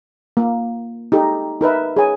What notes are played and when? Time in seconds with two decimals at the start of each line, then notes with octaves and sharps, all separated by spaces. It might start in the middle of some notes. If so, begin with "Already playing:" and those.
0.37 A#3
1.12 D#4 G4 A4
1.61 D#4 A#4 B4 E5
1.97 G#4 C#5 G#5